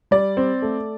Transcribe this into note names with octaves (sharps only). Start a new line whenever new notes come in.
G3 D5
C4
A3